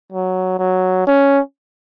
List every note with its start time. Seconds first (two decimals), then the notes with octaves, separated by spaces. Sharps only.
0.12 F#3
0.59 F#3
1.07 C#4